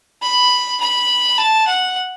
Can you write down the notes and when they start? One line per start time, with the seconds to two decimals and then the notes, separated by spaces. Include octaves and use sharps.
0.22 B5
0.80 B5
1.38 A5
1.67 F#5